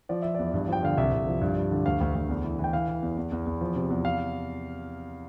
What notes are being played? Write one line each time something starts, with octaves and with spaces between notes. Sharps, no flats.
F3 D5
F3 E5
E2 D5
G2
F3 G5
D3 F5
C2 E5
C2
F3
G2
G2
D3
D2 F5
D2
D2
E2
E3
E3 G5
E3 F5
E3
E2
E2
E2
E2
F3
C3
E2
F5